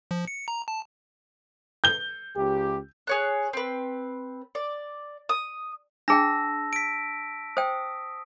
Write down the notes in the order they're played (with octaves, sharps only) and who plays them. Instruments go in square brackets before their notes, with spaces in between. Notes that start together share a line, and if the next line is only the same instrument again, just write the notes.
[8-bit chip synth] F3
C#7
A#5
A5
[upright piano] G6 G7
[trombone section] C#2 G4
[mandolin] G#4 C#5 F#6
C4 B4
D5
D#6
[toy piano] D4 G#4 G5 [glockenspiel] A5 E6 A#6
[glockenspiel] B6 D7
[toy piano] C5 G5 [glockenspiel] D#6